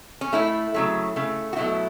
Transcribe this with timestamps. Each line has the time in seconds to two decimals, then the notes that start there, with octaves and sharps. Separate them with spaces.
0.21 C#4
0.33 A2 A3 E4
0.74 C#3 F#3 A3
1.16 C#3 A3
1.53 F#4
1.56 B2 F#3 A3 E4